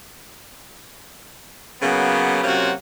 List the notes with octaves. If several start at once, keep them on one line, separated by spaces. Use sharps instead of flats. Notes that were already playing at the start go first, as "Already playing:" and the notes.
C#3 F#3 A#3 B3
C3 F#3 A#3 C#4 F4 F#4